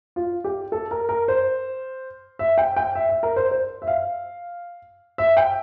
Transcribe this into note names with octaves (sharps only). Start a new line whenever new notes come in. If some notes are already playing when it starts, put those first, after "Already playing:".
F4
G4
A4
A#4
A#4
C5
E5
G5
G5
E5
E5
A#4
C5
C5
E5
F5
E5
G5